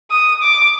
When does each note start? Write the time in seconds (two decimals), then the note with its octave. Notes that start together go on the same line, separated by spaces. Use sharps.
0.11 D#6
0.42 D6